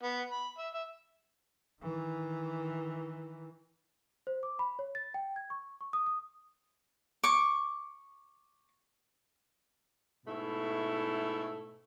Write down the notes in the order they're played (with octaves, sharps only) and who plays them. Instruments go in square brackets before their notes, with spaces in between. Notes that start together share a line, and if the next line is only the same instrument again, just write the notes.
[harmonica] B3
B5
E5
E5
[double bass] D#3 E3
[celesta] C5
D6
B5
C#5
A6
G5
G#6
C#6
C#6
D#6
D#6
[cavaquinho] C#6 D6
[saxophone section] G#2 B2 A3 E4